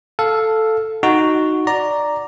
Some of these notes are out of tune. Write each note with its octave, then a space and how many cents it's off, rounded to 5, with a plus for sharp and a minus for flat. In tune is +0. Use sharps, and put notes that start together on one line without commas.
A4 +0 F5 +0
D#4 +0 F#4 +0
D5 +0 A#5 +0